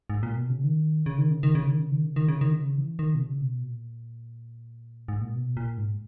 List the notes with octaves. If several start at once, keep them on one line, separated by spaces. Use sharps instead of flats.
G#2
A#2
B2
C#3
D#3
C#3
D#3
C#3
D#3
C#3
D#3
C#3
D#3
C#3
D#3
C#3
D#3
C#3
E3
D#3
B2
C#3
B2
A#2
G#2
A#2
B2
A#2
G#2